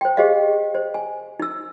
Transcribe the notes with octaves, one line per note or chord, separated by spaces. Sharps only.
C5 G5
G4 G#4 C5 D#5 F5
C5
G#5
D#4 E6